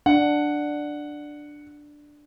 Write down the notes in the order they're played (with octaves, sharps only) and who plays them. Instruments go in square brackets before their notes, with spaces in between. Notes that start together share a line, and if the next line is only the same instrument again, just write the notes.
[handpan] D4 [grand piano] F#5